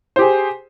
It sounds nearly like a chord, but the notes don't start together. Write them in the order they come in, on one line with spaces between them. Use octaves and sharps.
C5 G4 G#4